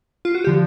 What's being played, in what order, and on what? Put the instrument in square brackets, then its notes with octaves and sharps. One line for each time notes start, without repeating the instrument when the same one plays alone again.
[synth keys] F4
F#4
G4
D3 F3